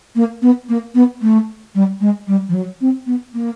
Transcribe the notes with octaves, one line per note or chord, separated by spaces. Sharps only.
A#3
B3
A#3
B3
A3
G3
G#3
G3
F3
F#3
C4
B3
A#3